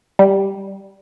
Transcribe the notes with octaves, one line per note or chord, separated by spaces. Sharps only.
G3